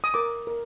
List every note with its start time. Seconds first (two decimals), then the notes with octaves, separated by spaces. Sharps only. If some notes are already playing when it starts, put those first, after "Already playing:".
0.04 D#6
0.14 A#4 D6
0.47 A#4